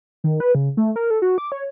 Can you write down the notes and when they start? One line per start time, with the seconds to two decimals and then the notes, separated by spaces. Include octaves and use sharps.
0.24 D#3
0.40 B4
0.55 C#3
0.77 A3
0.96 A#4
1.10 A4
1.22 F#4
1.38 D6
1.52 C#5